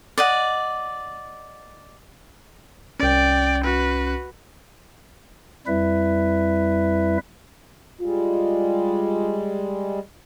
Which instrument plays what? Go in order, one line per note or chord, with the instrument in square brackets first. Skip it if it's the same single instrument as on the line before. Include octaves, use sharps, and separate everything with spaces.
[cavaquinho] D5 D#5 F#5
[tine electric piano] C2 C#4 [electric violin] D5 G5
[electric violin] F#4 B4
[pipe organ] F2 G3 E4 B4 E5
[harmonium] G3 G#3 [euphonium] F4